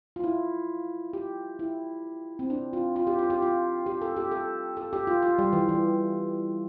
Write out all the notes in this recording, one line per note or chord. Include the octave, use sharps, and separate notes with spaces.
F4
E4
G4
E4
C4
D4
F4
F4
G4
F4
G4
F4
G4
A4
G4
A4
A4
G4
F4
F4
G3
E3
E3